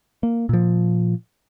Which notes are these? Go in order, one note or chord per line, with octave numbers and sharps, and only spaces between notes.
A#3
A#2 F3